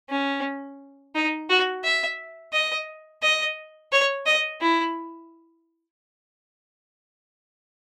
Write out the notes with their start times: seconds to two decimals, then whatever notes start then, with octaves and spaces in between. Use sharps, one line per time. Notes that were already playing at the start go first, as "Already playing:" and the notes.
0.10 C#4
1.15 D#4
1.50 F#4
1.84 E5
2.53 D#5
3.22 D#5
3.92 C#5
4.26 D#5
4.61 E4